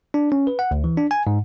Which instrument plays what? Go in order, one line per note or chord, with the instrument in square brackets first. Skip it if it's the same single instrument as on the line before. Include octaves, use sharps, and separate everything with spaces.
[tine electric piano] D4
C#4
B4
F#5
D2
E3
D4
G#5
G#2